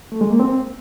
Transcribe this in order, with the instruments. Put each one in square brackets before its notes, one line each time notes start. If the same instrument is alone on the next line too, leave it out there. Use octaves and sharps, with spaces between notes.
[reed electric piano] A3
G#3
A#3
C4